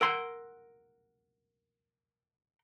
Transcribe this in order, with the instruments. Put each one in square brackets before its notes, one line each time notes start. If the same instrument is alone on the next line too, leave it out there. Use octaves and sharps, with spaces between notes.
[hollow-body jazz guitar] A#4 F#5 C6 [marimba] E6